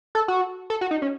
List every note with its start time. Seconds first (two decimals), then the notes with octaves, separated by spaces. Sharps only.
0.15 A4
0.28 F#4
0.70 A4
0.81 F#4
0.91 D#4
1.02 C#4